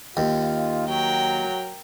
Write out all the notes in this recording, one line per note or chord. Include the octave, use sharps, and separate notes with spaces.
D#2 D#4 F4
F#3 A#4 G5